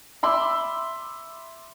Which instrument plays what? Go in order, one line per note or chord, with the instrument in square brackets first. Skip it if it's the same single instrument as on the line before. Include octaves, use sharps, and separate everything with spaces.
[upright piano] E5 B5 C6 D6 E6